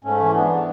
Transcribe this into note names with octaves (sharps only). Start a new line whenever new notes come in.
G#2 A3 C#4
E3
G#2 B3 D4
E3